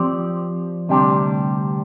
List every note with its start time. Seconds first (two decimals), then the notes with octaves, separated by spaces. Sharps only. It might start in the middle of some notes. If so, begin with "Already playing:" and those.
Already playing: F3 C4 G4 D5
0.89 D2 C3 G3 D4 G4